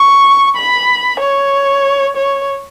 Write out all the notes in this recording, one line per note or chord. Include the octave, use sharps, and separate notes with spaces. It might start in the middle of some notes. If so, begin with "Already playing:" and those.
Already playing: C#6
B5
C#5
C#5